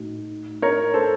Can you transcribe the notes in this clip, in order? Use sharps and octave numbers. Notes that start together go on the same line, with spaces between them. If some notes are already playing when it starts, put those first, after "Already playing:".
Already playing: A2 A3 D#4 F#4
A#4 C#5
A4 C5